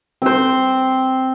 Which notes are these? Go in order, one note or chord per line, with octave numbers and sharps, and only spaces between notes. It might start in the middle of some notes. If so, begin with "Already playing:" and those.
C4 C5